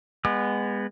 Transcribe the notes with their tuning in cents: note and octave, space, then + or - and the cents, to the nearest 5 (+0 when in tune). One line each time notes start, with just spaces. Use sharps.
G#3 -25 B3 +0 D#6 -35